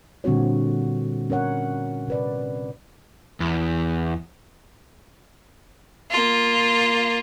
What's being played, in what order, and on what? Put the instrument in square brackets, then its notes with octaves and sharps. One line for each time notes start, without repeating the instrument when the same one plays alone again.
[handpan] A#2 D3 G3 C4 F#4 C#5
C#4 A#4 C#5 F#5
C3 B4 D5
[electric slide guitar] E2
[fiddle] A#3 F4